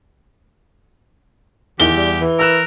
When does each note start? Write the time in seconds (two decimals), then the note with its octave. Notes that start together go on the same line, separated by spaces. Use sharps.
1.80 E2 D#3 E4 G4 G7
1.96 G3
2.21 E3
2.39 A#4 E6 F#6 E7